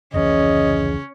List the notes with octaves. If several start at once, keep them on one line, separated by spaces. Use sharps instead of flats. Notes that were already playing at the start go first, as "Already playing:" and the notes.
F1 C#2 C#3 E3 C#4 D#5